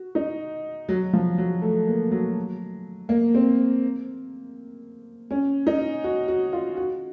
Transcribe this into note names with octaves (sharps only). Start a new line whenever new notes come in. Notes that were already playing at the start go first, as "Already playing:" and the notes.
Already playing: F#4
D#4
F#3
F3
F#3
A3
A#3
F#3
A#3
C4
C#4
D#4
F#4
F#4
F4
F#4